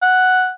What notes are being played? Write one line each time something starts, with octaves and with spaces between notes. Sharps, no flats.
F#5